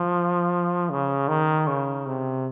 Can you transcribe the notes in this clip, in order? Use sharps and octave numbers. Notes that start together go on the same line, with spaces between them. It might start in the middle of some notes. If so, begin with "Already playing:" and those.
Already playing: F3
C#3
D#3
C#3
C3